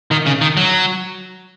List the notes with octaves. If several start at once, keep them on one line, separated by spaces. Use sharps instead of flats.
D#3
C#3
D#3
F#3